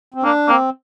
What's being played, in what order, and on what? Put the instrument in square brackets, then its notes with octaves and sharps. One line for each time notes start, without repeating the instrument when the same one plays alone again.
[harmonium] C4
[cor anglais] A#3 [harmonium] D4
[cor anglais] A#3 [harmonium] C4